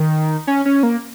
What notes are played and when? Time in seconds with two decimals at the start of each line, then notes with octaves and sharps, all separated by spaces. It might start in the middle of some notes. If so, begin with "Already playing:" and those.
Already playing: D#3
0.47 C#4
0.65 C#4
0.83 A#3